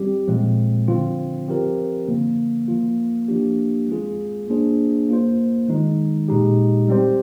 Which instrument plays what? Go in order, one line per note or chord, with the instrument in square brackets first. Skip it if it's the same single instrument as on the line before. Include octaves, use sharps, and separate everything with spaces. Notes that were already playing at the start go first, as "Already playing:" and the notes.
Already playing: [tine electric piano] G3 C4 G4
A#2 F3 G#3 C4
D3 F3 C4 F4
F3 C4 G4 A#4
D3 F3 A#3
F3 A#3 F4
F3 A#3 D4 G4
G#3 C4 F4 G#4
A#3 D4 F4 G#4 C5
A#3 F4 C5
D#3 G#3 D#4
A#2 G#3 D#4 G4
G3 C4 G4 C5